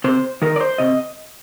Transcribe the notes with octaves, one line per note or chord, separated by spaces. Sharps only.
C3 C5
D#3 A#4
D5
C5
C3 D#5